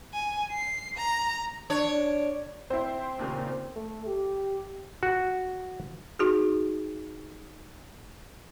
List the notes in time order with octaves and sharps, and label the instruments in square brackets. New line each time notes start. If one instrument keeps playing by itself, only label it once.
[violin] G#5
C7
A#5
[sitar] D4 C#5
[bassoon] C4 [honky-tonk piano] E4 C5
[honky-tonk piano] D#2 A#2 C#3
[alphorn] A3
G4
[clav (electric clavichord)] F#4
[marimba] D#4 F#4 G#4